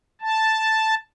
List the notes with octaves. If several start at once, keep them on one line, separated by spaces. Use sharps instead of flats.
A5